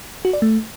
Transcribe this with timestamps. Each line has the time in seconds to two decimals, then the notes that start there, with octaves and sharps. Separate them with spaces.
0.25 F#4
0.33 D5
0.42 A3